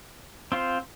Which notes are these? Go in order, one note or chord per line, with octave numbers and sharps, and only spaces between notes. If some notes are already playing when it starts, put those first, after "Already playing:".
C4 F4 C5